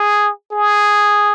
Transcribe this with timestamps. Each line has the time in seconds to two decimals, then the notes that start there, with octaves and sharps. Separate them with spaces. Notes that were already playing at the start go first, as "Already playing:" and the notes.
Already playing: G#4
0.52 G#4